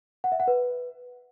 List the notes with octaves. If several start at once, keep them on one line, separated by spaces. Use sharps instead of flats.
F#5
E5
F#5
B4